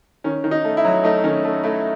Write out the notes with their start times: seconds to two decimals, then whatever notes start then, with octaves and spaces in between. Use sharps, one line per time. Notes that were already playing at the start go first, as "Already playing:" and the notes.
0.24 D#3 C#4
0.44 D#3
0.51 D#4
0.64 A3
0.77 E4
0.84 F#3
1.04 A3 D#4
1.24 D#3 C#4
1.44 A3
1.64 A3 E4